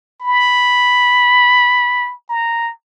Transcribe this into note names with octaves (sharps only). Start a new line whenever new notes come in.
B5
A#5